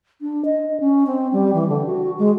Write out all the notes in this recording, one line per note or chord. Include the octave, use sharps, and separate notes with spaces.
D4
D#5
C#4
C4
G3
E3
D3
F#4
G#3